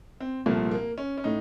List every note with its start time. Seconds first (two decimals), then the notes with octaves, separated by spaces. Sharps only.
0.20 C4
0.46 C2 A#2 F3 A3
0.71 A#3
0.98 C#4
1.18 C#4
1.24 A2 D#4